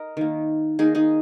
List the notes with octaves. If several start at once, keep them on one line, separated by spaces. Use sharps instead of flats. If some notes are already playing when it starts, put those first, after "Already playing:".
Already playing: A#4 D#5
D#3 A#3
D#3 A#3 D#4 G#4
D#4 G#4